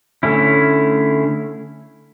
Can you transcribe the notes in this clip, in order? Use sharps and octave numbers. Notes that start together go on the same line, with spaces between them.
D3 A3 C#4 E4